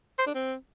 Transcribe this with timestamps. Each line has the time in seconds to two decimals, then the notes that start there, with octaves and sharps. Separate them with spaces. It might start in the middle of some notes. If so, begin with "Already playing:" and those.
0.19 C5
0.27 D4
0.35 C4